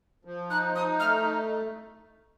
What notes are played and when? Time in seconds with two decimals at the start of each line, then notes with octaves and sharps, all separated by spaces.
0.25 F3
0.50 D#4 F#6
0.76 D#4 D#6
0.99 A3 F6